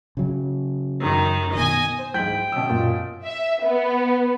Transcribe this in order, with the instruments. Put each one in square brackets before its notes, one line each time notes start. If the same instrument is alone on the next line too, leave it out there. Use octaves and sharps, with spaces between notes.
[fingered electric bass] C#3 F#3
[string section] F#2 D#3
[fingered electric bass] B2 D#3 [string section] D#5 G#5
[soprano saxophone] C5
[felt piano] G#2 E3 [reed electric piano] F#3 G#3 [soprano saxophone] G5 [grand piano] G6 B6 F#7
[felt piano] B2 C#4 E6
[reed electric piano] F#2 [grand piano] A#2
[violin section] E5
B3